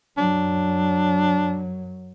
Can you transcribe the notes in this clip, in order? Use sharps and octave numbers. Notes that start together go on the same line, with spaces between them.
F#2 F#3 D4